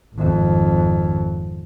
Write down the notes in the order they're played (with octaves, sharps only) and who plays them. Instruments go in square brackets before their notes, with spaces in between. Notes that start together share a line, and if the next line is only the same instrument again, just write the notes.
[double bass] G#1 F2